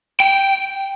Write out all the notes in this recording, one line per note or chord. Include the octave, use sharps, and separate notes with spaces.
G5